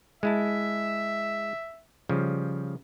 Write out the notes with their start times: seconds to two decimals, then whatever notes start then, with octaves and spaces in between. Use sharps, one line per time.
0.23 G#3 E4 E5 A5
2.09 C#3 F3 G3